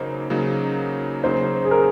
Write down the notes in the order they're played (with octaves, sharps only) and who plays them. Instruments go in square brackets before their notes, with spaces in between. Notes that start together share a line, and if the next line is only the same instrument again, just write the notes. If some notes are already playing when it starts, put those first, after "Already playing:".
Already playing: [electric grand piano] C#3 F#3 A#3 D#4 [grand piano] C5
[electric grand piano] C#3 F#3 A#3 D#4
[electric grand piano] C#3 F#3 A#3 D#4 [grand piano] C5
[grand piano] G#4
A#4